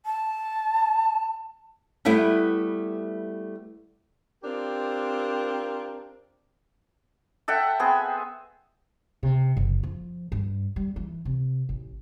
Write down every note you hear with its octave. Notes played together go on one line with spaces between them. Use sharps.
A5
G3 A3 B3 E4 B4
C4 D4 F4 G4 A#4
A4 E5 F#5 G5
B3 C4 G#4
C3
F#1
F3
G2
G3
E3
C3
A1